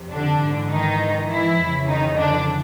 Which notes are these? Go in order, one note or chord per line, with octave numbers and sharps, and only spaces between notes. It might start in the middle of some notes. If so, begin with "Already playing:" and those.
Already playing: F2 C3
D3 D4
G#2 E3
D#3 D#4
E3 E4
F2 C#3 E3
D#3 D#4
D3 D4